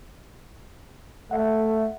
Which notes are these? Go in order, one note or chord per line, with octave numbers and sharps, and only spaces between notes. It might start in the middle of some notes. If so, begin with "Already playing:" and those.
A3 E5 F#5